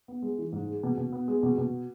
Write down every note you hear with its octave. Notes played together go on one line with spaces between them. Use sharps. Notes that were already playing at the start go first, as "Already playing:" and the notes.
B3
G#3
E3
G#2
G#3
B2
B2
B3
G#3
B2
B2